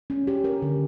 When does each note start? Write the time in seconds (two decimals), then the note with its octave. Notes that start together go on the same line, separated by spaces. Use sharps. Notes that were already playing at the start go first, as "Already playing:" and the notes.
0.10 C#4
0.27 G4
0.44 A#4
0.62 D3